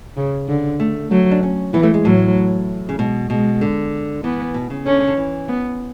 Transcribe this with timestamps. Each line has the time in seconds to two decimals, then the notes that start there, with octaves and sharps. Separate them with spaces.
0.17 C#3
0.48 D3
0.80 A3
1.11 F#3 A3
1.31 D4
1.43 C#4
1.74 E3 B3
1.83 A3
1.94 G#3
2.05 A2 F#3
2.89 C#3
2.99 B2 G#3
3.30 B2 G#3
3.61 D3
4.24 E3 B3
4.54 B2
4.70 C#3
4.86 D3 C#4
4.98 C#3
5.08 D3
5.17 E3
5.49 B3